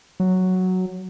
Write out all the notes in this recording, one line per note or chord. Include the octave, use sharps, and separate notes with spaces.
F#3